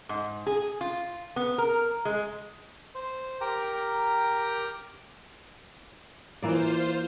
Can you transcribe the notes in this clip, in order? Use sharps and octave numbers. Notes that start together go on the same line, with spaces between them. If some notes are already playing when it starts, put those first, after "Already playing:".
G#2
G#4
F4
B3
A#4
G#3
C5
G4 A#4 G5 A#5
E3 A#3 F4 C5 D5